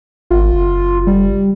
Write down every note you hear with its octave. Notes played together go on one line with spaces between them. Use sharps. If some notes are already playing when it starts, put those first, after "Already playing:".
G#1 F4
F#1
G3